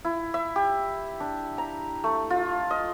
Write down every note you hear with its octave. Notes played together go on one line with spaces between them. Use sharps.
E4
E5
G4
D4
A#5
A3
F4
D#5